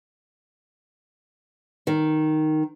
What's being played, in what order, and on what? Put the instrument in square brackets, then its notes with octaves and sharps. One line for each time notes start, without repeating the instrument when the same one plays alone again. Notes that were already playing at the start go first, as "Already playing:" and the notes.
[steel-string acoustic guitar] D#3